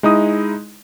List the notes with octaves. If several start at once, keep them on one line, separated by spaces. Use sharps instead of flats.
G#3 D#4 E4 D#6